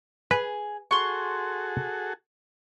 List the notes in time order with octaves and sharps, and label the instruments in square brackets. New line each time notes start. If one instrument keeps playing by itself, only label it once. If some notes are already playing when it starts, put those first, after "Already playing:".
[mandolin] G#4 [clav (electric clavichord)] B4
[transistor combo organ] F#4 G#4 A4 [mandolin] C6 C#6